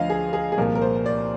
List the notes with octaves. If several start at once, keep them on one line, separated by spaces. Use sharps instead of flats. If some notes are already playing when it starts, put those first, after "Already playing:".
Already playing: D2 D3 F3 D#5 F5
G#4
G#4
G#4
C2 A#2 F3 A#4
A#4
C5
D5